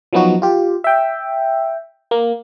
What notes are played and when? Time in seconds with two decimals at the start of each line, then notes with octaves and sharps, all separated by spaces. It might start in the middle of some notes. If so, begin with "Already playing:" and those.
0.13 F3 F#3 B3 D#4 F#4
0.42 F4 G4
0.84 E5 G5
2.11 A#3